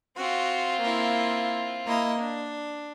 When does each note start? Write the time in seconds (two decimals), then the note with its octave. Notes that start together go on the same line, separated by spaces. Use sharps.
0.17 C4 F4 F#4
0.82 A#3 E4
1.87 A#3 E4 D#5
2.19 D4